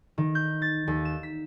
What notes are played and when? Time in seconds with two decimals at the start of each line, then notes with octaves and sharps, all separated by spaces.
0.18 D#3
0.35 G6
0.62 A6
0.87 D#2
1.05 E7
1.23 B6